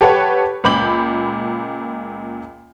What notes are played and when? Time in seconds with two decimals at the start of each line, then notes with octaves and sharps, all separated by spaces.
0.01 G4 A4 B4 C#5 F#5
0.64 C#2 A#2 B5 D6 G6 F#7